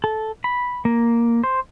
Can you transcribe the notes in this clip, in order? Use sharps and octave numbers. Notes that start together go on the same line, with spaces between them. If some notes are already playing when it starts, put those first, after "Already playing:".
A4
B5
A#3
C5